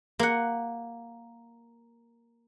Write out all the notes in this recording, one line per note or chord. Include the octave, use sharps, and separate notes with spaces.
A#3 F#5